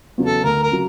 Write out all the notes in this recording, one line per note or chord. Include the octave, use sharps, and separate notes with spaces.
E2 C#3 F#3
A4
D2 A#4
A#4
C#3 F#3